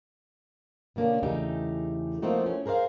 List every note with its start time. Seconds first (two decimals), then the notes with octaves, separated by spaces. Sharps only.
0.96 B2 D3 A#3 C#4 D4
1.23 E2 C#3 A3 D#4 G4
2.22 F3 A3 A#3 C4 D#4 F#4
2.46 C#4
2.66 G#4 A#4 C5 D5 F5